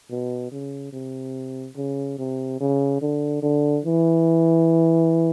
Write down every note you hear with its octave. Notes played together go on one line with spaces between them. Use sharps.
B2
C#3
C3
C#3
C3
C#3
D3
D3
E3